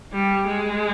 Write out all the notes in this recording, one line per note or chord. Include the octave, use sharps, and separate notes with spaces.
G3
G#3